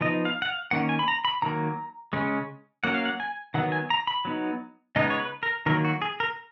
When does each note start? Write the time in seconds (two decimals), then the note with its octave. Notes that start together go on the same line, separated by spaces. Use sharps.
0.01 F3 B3 D#4 D#5
0.25 F5
0.42 F#5
0.48 F5
0.71 D#3 A#3 C#4 F#5
0.89 G#5
0.99 B5
1.08 A#5
1.25 B5
1.42 D#3 F#3 A#3 A#5
2.13 C#3 G#3 C#4
2.84 F#3 A#3 C#4 F#5
2.94 F5
3.05 F#5
3.20 G#5
3.54 D#3 F#3 B3 F#5
3.72 G#5
3.90 A#5
4.07 B5
4.25 F#3 B3 D#4
4.96 C#3 G#3 B3 D#4 D#5
5.10 C#5
5.19 B4
5.43 A#4
5.66 D#3 F#3 A#3 A#4
5.85 F#4
6.02 G#4
6.20 A#4